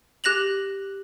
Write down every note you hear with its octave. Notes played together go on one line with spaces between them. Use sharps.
G4 F#6 A#6 F7 F#7